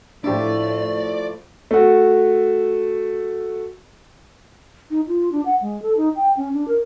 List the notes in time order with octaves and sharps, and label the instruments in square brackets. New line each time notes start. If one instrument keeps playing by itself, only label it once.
[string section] A2 [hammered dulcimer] F3 A3 E4 [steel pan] D4 G4 [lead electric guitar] D5
[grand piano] A3 F#4
[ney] D#4
F4
D4
F#5
G#3
A4
D#4
G5
C#4
D4
A#4